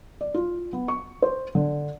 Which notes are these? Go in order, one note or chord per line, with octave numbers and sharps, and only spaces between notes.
D5
F4
B3
C#6
C5
D3